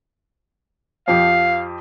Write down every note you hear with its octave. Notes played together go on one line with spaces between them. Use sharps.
F2 F3 G4 F5